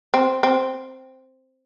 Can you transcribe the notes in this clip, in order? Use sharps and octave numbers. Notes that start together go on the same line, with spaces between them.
C4
C4